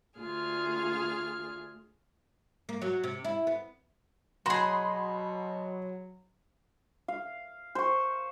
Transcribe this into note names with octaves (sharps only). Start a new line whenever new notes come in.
D2 F4 G#4 F6
A#3
F#3
C3
E4
B3
B2 F#3 F#4 G#4 B5 C6
F5
C5 C#6